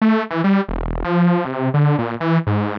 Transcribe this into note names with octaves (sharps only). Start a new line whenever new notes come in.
A3
E3
G3
E1
F3
C3
D3
A#2
E3
G#2